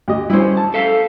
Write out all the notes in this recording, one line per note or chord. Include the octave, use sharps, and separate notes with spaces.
D2 G4 D#5
G3 C#4 E4 C5
C5
A5
A4 E5 F5